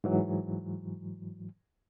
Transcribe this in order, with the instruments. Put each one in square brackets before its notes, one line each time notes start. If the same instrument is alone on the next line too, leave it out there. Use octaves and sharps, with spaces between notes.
[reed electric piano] G#2 E3 F#3